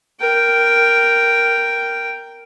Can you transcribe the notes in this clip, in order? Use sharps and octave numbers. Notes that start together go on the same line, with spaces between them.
A#4 G5